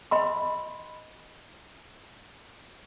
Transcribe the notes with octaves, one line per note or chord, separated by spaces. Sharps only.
D#5 B5 C6